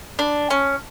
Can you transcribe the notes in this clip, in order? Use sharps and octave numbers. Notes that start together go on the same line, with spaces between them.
D4
C#4